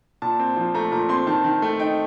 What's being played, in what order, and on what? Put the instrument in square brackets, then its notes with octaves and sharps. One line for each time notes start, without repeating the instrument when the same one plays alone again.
[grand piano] A#2 A5
C4
F3
A3 A#5
A#2 A#5
C4 C6
D#3 A5
D#3
A3
D#4 G5